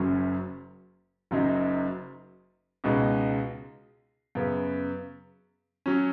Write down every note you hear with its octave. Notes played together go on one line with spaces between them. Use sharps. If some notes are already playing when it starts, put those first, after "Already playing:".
Already playing: F#1 F#2 F#3 C#4
F#1 F#2 F#3 D#4
C#2 B2 G#3 D#4
F#2 C#3 B3
F#3 C#4